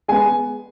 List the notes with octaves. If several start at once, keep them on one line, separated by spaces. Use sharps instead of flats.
G#3 B3 G#5